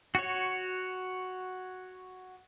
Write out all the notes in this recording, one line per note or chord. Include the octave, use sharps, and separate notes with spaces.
F#4 C#5